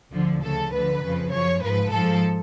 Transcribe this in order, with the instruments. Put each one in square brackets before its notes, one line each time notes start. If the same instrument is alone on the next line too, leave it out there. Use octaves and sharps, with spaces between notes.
[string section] D2 D3 F3
D2 C#3 F3 A4
D2 D3 F3 B4
F2 C#3 F3
F#2 F3 C#5
G#2 F3 B4
G#2 F3 A4